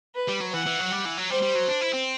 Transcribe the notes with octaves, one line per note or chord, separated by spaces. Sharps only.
B4
G3
F#3
E3 F#5
E3
F#3
G3
E3
F#3
G3 C5
G3
F#3
D4
E4
C4